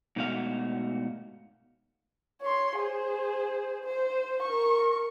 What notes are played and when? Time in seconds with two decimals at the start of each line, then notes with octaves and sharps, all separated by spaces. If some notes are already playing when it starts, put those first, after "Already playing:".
0.16 G#2 B2 A3 F#4 F5
2.42 C#5 C6
2.77 G#4 C5
3.84 C5
4.42 A#4 C#6